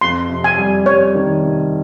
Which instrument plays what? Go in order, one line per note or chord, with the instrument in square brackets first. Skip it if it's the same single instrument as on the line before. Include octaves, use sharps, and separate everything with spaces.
[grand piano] F2 [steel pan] C6
[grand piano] C3
[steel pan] G#5
[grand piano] G3
[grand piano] G3 [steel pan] C#5
[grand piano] D#3
C3